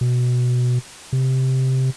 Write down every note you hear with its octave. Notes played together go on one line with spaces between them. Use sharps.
B2
C3